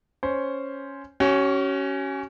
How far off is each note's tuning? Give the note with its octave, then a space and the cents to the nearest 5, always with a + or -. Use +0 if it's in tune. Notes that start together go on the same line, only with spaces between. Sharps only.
C#4 +0 C5 +0
C#4 +0 F#4 +45